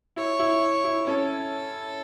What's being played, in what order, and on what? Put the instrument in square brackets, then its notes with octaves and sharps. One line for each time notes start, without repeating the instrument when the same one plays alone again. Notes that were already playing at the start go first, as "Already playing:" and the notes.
[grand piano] E4 [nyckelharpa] C#5
[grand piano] E4
E4
[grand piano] C#4 [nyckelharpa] A4